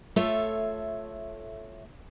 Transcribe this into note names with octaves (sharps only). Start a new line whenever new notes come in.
A3 F4 A4 C#5 E5